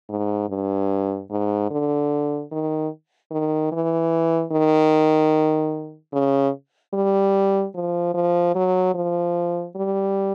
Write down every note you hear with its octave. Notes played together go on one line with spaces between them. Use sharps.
G#2
G2
G#2
D3
D#3
D#3
E3
D#3
C#3
G3
F3
F3
F#3
F3
G3